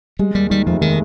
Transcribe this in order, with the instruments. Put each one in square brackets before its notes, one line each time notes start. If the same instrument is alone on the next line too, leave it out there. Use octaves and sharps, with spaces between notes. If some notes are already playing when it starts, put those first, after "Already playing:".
[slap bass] G3 [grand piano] G#3
[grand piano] D#2 [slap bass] G3
[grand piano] D#3 [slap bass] G3
[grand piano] F1 [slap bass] F3
[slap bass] D#3 [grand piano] G#3